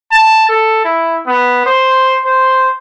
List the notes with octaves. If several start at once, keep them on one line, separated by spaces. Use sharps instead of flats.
A5
A4
E4
B3
C5
C5